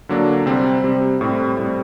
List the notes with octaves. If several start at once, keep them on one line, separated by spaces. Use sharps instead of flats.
D3 F#3 A#3 D4
C3 G3 C4
C3 G3 C4
A2 G3 C4
A2 G3 C4